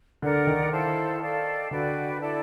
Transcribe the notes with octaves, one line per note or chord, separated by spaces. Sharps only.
D3 A#4 D5 F#5
D#3
E4 A4 C5 F5
A4 D5 F5
D3 F#4 B4 D5 G5
E4 A4 D5